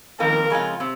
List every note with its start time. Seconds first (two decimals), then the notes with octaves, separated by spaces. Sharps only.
0.20 F2 D#3 A#3 F4 A#4
0.50 F2 C#3 G#3 C#4 F4
0.80 C3